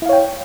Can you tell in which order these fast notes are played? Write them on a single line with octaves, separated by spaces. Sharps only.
E4 F5 C#5 G5